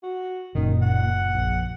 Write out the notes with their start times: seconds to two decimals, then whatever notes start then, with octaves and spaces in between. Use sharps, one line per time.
0.03 F#4
0.55 F#1 A#2 D#3 C#4
0.82 F#5
1.34 A#1